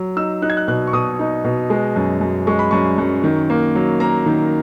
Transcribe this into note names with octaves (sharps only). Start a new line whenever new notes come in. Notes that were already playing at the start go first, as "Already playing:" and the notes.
Already playing: F#3
D#4 E6
D#4 F#6
G#6
F#6
B2 F#6
C#6
B2 D#6
D#4
B2
G#3
F#2
F#2
G#3 C#6
B5
F#2 C#6
F#2
D#3
A#3
F#3
A#3 A#5
D#3